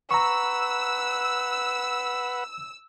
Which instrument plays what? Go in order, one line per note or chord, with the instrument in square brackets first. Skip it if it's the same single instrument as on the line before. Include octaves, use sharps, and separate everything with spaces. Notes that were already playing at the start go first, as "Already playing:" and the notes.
[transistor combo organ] B4 F#5 [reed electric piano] A#5 C#6 [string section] E6